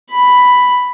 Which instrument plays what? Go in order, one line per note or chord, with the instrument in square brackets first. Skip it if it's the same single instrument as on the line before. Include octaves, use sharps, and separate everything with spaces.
[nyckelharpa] B5